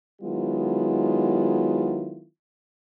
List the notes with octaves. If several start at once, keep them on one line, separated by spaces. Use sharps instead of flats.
D#3 F#3 G#3 B3 E4 F4